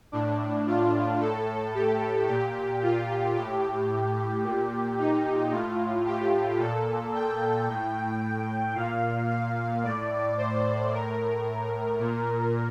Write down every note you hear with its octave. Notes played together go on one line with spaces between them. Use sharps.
A2 D4
F4
A2 A4
G4
A#2 G4
F4
A2 G4
A#2
D#4
A2 F4
G4
A#2 A4
G5
A2
A#2 F5
F5
A2 D5
C5
A2 A#4
A#2